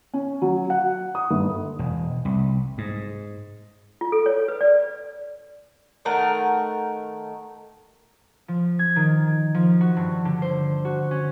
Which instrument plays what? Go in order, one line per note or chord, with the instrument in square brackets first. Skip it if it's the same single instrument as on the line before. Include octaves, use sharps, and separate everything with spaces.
[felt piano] C#4
F#3
F#5
D#6
G1
[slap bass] E1
C2
G#2
[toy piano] F4
A4
C#5
B4
D5
[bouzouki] D#3 A3 A#4 F#5
[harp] F3
G#6
D#3
F3
F#4
G2
D3
C5
F#4
C#4